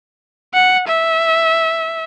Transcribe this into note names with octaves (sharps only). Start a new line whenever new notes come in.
F#5
E5